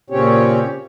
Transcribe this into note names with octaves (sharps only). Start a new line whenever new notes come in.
A#2 C#3 C4 C#4 G4 C#5